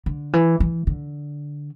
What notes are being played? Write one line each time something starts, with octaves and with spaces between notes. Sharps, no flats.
D3
E3
E3
D3